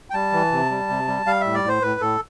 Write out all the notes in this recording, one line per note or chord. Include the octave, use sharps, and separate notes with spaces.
G5
G3 A5
E3
C3
G3
C3
G3
G3 F5
A2 E5
D5
A2 C5
A2 B4
A2 A4